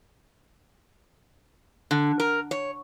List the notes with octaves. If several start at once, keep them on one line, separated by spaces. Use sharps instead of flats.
D3
A#4
C#5